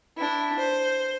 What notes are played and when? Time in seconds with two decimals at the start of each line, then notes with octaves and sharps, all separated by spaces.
0.17 D4 E4
0.58 C5